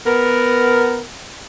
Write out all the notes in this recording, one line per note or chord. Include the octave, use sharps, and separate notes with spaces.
B3 A#4